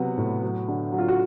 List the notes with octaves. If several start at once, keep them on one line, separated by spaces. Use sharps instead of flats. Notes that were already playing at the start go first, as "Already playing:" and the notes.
Already playing: C3 F#3 B3
A2
F#3
D3
F#3
F4
F#4